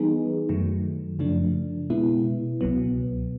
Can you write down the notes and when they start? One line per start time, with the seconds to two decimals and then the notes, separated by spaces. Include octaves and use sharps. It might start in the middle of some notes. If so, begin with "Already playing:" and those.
Already playing: E3 G3 B3 D#4 G#4
0.49 F#2 D#3 F#3 A3
1.19 F#2 C#3 F3 A3 D4
1.90 B2 G#3 B3 E4
2.61 C#2 B2 F#3 B3